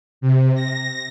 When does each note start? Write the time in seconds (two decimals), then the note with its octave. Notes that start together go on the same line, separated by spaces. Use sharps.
0.21 C3
0.55 A#6